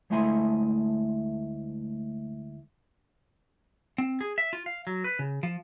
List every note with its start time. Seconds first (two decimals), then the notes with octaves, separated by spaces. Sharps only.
0.10 D2 G#3 A3 E4 G#5 C6
3.98 C4
4.21 G#4
4.38 E5
4.53 F4
4.66 F5
4.87 F#3
5.04 B4
5.19 C#3
5.43 F3